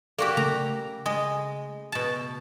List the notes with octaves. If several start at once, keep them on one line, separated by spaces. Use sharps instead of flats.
A#3 F#4 G4 A4 D5 F5
C#3 A3 A#5
G#3 D#5
B2 A5